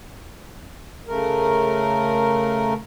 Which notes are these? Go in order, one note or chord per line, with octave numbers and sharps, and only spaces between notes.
C#3 A3 A#4